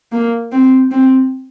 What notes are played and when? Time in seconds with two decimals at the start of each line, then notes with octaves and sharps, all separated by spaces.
0.12 A#3
0.52 C4
0.91 C4